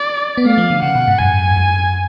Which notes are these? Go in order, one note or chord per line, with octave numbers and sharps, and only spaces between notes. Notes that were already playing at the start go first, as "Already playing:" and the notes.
Already playing: D5
B3
A3 F5
F3
D3
C#3 F#5
B2
G#2
F#2 G#5
G#2
F#2